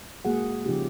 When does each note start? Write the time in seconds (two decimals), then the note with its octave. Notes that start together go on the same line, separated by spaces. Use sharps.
0.25 G#3 A#3 F#4 G#4 F#5
0.66 C#3 F3 C#4 D#4 F4 G4